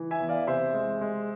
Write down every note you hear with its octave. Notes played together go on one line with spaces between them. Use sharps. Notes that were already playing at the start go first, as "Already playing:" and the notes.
Already playing: E3
E5 G#5
E2
D5 F5
C3 C5 E5
G#3
G#3